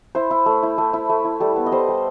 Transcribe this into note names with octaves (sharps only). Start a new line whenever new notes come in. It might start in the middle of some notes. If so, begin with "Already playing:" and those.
E4 C5
E4
A3
E4
A3
E4
A3
E4
G3 A4
B3
D#5
G3 C5
G3